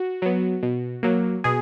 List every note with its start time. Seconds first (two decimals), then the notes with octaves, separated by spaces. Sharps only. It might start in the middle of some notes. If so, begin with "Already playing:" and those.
Already playing: F#4
0.22 F#3 B3
0.63 B2
1.03 F#3 A#3
1.44 B2 G#4